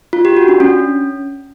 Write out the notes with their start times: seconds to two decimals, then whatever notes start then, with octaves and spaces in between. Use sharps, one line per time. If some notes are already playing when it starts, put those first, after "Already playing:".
0.13 F4
0.25 G4
0.37 F#4
0.48 D4
0.60 C#4